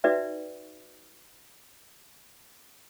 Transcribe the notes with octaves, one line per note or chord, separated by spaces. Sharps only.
D#4 F#4 B4 D5 E5 G5